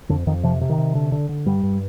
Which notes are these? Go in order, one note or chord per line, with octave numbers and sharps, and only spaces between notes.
F2 D3
F2 D#3
C3 F3
C3
D#3
C3
D3
D3
D3
G2 G3
G2